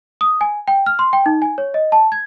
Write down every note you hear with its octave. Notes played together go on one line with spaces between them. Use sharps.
D#6
G#5
G5
F6
C6
G5
D#4
G#5
C#5
D#5
A5
G#6